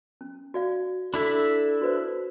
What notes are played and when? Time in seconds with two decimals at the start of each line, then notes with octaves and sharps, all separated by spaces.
0.21 C#4
0.54 F#4 D5 F5
1.14 D4 E4 A4 E5 B5
1.81 F#4 B4 C5